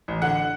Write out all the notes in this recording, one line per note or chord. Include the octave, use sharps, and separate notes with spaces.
A1
D3 F#5